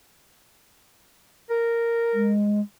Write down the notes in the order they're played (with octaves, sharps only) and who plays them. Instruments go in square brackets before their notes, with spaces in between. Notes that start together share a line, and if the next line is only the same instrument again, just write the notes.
[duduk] A#4
[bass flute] G#3